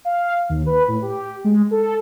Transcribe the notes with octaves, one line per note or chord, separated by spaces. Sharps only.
F5
D#2
B4
A2
G4
G#3
A4